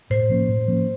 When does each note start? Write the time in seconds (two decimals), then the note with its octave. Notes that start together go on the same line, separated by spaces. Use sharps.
0.10 A2 C5
0.30 F3 A#3 C#4
0.48 A2
0.67 F3 A#3 C#4